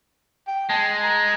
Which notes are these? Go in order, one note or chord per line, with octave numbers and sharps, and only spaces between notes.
G5
G#3 A5
A#5